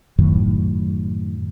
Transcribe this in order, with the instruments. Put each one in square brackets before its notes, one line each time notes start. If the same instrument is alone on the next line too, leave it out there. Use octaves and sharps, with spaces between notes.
[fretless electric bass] F#2 A2 D#3 F#3